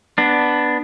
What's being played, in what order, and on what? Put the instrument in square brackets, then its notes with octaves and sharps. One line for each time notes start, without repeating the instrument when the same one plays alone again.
[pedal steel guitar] B3 D4